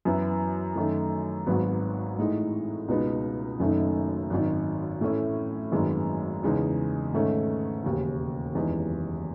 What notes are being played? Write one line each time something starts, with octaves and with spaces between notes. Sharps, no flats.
F#2 E3 B3 E4
F#2 D#3 A3
G#1 G#2 F#3 B3
A2 E3 G#3 D#4
C#2 B2 G#3 B3 D#4
F#1 F#2 D#3 A3 D#4
G#1 F#2 D#3
A2 E3 A3 C#4 E4
G#1 F#2 D#3 G#3 B3
E2 C#3 G#3 D#4
G#2 D#3 A3 C#4
E1 D#2 C#3
F#1 E2 D#3 G#3